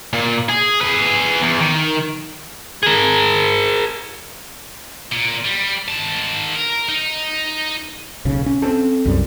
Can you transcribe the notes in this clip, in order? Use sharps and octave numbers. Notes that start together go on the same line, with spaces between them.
A#2
G#4
G#4 B4
E2
D#3
G#4 A#4
A#2
G3
D#3 A5
A#4
D#4
D#1 B1 C#3
C#4
C4 A4
C2 F#2 G3